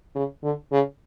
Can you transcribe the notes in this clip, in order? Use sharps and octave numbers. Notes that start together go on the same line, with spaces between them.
C#3
D3
C#3